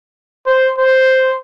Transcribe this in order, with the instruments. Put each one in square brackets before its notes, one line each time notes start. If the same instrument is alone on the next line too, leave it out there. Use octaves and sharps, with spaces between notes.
[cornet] C5
C5